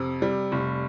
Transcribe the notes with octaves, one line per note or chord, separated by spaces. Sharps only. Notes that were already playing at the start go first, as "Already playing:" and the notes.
Already playing: F2 C3
G3
F1